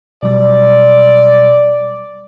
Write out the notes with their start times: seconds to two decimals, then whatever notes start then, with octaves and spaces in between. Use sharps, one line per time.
0.23 B2 F#3 G3 D5